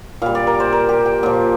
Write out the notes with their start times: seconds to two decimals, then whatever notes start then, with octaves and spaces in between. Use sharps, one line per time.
0.22 A#2 G3 F5
0.35 D5
0.47 A#4
0.60 C5
0.73 A#4
0.89 G4
1.06 G5
1.23 A#2 F3